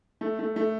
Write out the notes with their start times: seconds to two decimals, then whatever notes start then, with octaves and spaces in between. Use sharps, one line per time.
0.21 A3
0.39 A3
0.56 A3